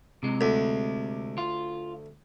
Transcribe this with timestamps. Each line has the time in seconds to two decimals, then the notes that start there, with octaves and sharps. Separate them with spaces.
0.23 C3 G#3
0.41 D2
1.38 F4